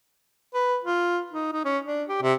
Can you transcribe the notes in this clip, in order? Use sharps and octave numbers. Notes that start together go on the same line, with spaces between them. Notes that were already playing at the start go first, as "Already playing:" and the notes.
B4
F4
D#4
D#4
C#4
D4
G4
C3